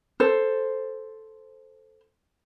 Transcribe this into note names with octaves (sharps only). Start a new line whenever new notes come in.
A4 C5